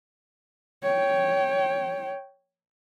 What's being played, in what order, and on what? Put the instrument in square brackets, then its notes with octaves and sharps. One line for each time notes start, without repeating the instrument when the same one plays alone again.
[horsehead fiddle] C#5 G5